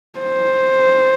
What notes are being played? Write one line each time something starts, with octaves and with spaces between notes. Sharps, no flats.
C5